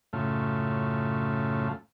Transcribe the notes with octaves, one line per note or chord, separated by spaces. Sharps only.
F#2 A2 C#3 A3 F4